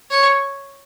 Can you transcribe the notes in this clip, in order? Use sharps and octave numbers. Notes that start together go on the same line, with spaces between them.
C#5